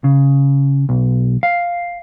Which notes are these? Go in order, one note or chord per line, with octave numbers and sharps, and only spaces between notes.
C#3
B1
F5